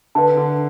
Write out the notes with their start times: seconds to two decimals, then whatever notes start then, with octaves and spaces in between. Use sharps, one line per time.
0.15 D3 B4 E5 A5
0.37 D3